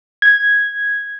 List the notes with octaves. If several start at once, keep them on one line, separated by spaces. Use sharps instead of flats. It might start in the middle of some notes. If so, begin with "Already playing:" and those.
G#6